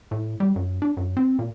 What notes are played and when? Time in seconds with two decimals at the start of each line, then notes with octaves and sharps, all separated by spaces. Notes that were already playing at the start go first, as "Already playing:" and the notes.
0.11 A2
0.40 G3
0.56 F#2
0.82 D4
0.97 F#2
1.17 C4
1.39 A#2